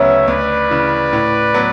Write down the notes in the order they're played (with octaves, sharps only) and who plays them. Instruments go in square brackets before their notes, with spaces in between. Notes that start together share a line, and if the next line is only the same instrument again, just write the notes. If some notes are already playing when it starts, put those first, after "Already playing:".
Already playing: [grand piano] D2 C#3 F#3 B3 [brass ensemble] C#5 E5
[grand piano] D2 [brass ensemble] B4 D5
[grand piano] C#3 E3
A2
F#3 B3